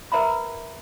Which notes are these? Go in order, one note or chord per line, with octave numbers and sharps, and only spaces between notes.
A#4 B4 E5 A#5 B5